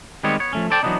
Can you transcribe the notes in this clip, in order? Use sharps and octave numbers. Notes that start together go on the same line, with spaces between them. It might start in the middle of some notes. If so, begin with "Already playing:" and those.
D#3 G3 G#3 B3 C4 C#5
B3 C#5
F3 A3 C#4
A4 C5 D5 G5 A5
E3 F#3 A#3 B3 D4 D#4